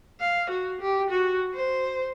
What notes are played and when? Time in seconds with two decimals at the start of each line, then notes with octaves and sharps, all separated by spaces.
0.20 F5
0.50 F#4
0.81 G4
1.10 F#4
1.54 C5